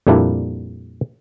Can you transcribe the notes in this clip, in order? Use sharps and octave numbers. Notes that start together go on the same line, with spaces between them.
F2 A#2 G3 A#3 D4 E4